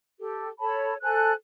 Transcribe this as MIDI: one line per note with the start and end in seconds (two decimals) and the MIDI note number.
0.20 0.49 67
0.20 0.49 69
0.60 0.95 69
0.60 0.95 73
0.60 0.95 81
0.60 0.95 83
1.01 1.33 69
1.01 1.33 72
1.01 1.33 80
1.01 1.33 90